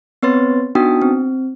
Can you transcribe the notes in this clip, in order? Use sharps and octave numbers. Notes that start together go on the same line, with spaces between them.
B3 C4 B4 C#5 C6 A6
B3 D4 D#4 F#4 G5 D#6
C4